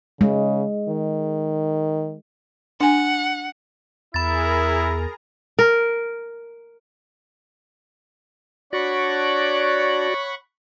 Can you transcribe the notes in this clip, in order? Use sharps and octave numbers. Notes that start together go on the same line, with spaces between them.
C#3 G#3
D#3
D4 F#5 G#5
E2 E4 G#4 A#4 A#5 B5 A6
A#4
D4 F#4 C#5 D5 F#5 B5 C#6